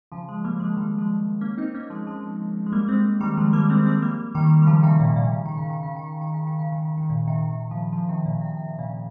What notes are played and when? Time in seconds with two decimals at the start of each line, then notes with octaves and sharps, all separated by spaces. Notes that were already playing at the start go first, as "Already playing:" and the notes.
0.12 C#3 F3
0.29 F3 G#3
0.44 G3 A#3
0.55 A#3
0.60 F3 G#3
0.77 D#3 G3
0.98 F3 G#3
1.41 A#3 C#4
1.58 C4 D#4
1.74 A#3 C#4
1.90 F3 G#3
2.07 F3 G#3
2.66 G#3
2.72 G3 A#3
2.88 G#3 C4
3.20 D#3 G3
3.37 F3 G#3
3.53 G3 A#3
3.70 G#3 C4
3.86 G#3 C4
4.02 G3 A#3
4.35 D#3 G3
4.62 G3
4.67 C#3 F3
4.83 C3 D#3
4.99 A#2 C#3
5.16 A#2
5.32 C#3
5.46 D#3
5.58 C#3
5.70 D#3
5.83 C#3
5.96 D#3
6.08 C#3
6.21 D#3
6.34 C#3
6.47 D#3
6.59 C#3
6.72 D#3
6.85 C#3
6.98 D#3
7.10 A#2 C#3
7.27 C3 D#3
7.49 C3 D#3
7.71 C#3 F3
7.93 C#3 F3
8.09 C3 D#3
8.25 A#2 C#3
8.41 C3
8.57 C3
8.79 A#2 C#3